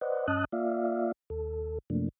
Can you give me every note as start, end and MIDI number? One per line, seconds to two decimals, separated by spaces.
0.01 0.27 71
0.01 0.27 72
0.01 0.27 74
0.01 0.27 75
0.01 0.27 78
0.28 0.45 43
0.28 0.45 61
0.28 0.45 75
0.28 0.45 81
0.28 0.45 87
0.28 0.45 90
0.52 1.12 58
0.52 1.12 65
0.52 1.12 74
0.52 1.12 76
0.52 1.12 77
1.30 1.78 39
1.30 1.78 69
1.90 2.09 42
1.90 2.09 48
1.90 2.09 53
1.90 2.09 57
1.90 2.09 58
1.90 2.09 62